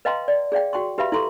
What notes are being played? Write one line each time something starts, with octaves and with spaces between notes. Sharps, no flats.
B4 D#5 F5 G5 A#5 C6
D5
G#4 D5 F5 G5
F#4 G5 C6 C#6
G4 B4 E5 F5 B5
E4 A4 C6 C#6